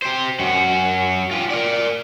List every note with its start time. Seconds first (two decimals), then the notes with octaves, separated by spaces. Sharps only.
0.02 G4 C5
0.39 F#2 F#4
1.31 F4 G4
1.50 A#4 D5